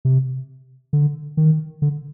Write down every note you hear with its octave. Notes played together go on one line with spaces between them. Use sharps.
C3
D3
D#3
D3